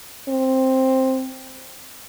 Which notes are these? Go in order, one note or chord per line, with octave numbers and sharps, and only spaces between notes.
C4